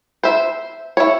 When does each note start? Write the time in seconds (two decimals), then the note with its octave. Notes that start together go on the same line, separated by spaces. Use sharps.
0.23 C5 E5
0.97 E4 C#5